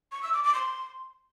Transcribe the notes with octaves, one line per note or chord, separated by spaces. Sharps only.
C#6
E6
D6
D6
C6